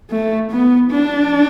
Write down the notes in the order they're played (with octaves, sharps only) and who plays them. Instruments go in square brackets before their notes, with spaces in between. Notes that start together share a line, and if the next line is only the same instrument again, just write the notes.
[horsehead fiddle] A3
B3
D4